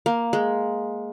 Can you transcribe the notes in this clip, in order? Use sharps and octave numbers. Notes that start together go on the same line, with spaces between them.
A#3
G#3